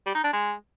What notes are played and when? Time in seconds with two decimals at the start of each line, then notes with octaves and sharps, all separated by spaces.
0.06 G3
0.15 D#4
0.24 D4
0.33 G#3